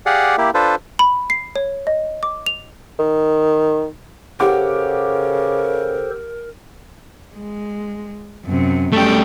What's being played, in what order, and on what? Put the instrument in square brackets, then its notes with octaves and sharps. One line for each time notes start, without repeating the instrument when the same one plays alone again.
[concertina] G4 G#4 D5 F5 F#5
A#3 E4 G4
D4 F4 A4 B4 C5
[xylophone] B5
C7
C#5
D#5
D6
F7
[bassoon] D#3
[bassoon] C#3 [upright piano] G4 F#5 D6 [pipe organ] A4 C5 [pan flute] A#4
[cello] G#3
F#2 C3
[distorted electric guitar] G3 A3 [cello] C#4 G5